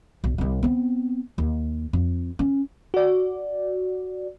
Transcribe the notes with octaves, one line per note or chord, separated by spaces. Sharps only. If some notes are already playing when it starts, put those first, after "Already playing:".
B1
C2 C3
B3 C4
D#2
F2
C#4
F#4 D5